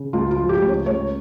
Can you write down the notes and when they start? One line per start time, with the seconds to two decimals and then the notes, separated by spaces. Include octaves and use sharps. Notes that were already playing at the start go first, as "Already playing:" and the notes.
Already playing: C#3
0.13 C#2 F4
0.31 F4
0.38 F3
0.49 G4
0.62 C#2
0.68 C#5
0.86 C#2 C#5